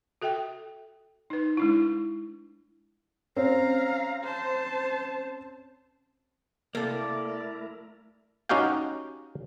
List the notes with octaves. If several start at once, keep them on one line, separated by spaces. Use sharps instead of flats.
F#4 A4 E5 G5
D#4 B4
G#3 D4 E4
C4 C#4 F5 A#5
C5 A5
C3 A3 A#3 E4 A4 A#4 D5
C#4 D#4 F#4 G4 F5 G5